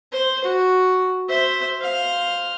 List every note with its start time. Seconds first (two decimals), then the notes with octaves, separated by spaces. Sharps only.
0.12 C5
0.44 F#4
1.29 C5 E5
1.81 C5 F5